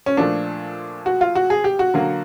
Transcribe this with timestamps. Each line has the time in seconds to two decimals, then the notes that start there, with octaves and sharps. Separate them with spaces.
0.06 C#4
0.17 A#2 F3 A3 D4
1.06 F#4
1.21 F4
1.35 F#4
1.50 G#4
1.64 G4
1.79 F#4
1.94 D3 F#3 A#3